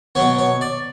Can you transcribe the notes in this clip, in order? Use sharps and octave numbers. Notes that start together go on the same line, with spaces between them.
B2 F#3 B3 C#5
C#5
D5